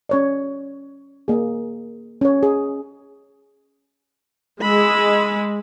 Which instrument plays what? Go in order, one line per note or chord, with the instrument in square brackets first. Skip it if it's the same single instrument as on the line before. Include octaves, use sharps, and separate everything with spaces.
[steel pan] C#4 C#5 D5
A#3 G#4
C#4 C#5
G#4
[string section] G#3 [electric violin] B5 E6